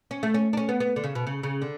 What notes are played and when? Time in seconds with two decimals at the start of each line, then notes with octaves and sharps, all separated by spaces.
0.11 C#4
0.23 A3
0.34 C#4
0.53 D4
0.57 C#4
0.69 B3
0.80 B3
0.96 D3
1.04 C#3
1.15 B2
1.27 C#3
1.43 C#3
1.62 D3